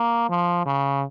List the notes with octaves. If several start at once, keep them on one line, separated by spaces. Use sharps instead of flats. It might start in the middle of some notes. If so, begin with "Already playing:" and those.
Already playing: A#3
F3
C#3